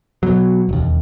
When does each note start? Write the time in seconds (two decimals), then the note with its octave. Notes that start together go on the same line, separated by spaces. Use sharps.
0.23 B2 F#3
0.69 E1 D#2